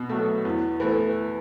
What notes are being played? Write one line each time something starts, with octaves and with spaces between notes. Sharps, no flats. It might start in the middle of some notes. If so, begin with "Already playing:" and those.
Already playing: B2
F#3 A3
E2
E3 A3